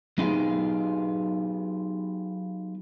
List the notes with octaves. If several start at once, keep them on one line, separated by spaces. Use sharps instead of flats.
F#3 B3 D#4 F4 G4 G#4